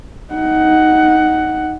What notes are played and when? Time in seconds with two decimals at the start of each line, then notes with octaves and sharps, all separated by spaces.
0.34 D#4 F#5